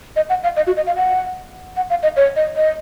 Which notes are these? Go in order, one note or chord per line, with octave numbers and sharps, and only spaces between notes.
D#5
F#5
F5
D#5
F#4
D#5
F5
F#5
F#5
F5
D#5
C#5
D#5
D#5